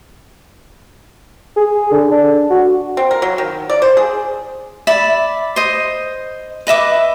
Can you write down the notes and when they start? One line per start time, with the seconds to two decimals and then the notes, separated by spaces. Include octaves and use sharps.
1.56 G#4
1.91 D3
2.11 D4
2.50 F#4
2.97 C4
3.11 A#4
3.22 F#3
3.38 D#3
3.70 D5
3.82 C5
3.97 G#4
4.87 D5 E5 B5
5.56 C5 D#5
6.67 B4 D#5 E5 D6